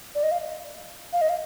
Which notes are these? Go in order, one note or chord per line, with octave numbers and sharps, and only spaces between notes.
D5
D#5
F5
F5
D#5
F5